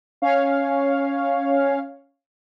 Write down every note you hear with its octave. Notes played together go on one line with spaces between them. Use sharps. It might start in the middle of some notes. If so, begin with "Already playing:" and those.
C#4 C#5 F5